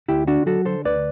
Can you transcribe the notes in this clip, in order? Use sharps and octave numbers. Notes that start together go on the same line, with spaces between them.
D2 E4 G4
D3 D4 F#4
F#3 F#4 A4
D3 A4 C5
D2 B4 D5